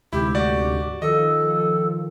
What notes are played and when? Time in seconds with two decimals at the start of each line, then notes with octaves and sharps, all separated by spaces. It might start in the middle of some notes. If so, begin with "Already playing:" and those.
0.13 D2 G#2 C3 E4 G4
0.35 F#4 D5
1.02 D#3 F3 A4 D#5